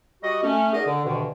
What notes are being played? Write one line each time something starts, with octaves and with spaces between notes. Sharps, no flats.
G3 F#4 D#5
A3 C#4
D#4 F#4 G#4 A#4 D5 D#5
D3
D2 G2 B2 D3 D#3